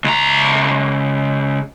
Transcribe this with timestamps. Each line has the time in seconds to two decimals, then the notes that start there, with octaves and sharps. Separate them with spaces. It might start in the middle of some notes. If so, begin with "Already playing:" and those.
0.04 C#2 A#5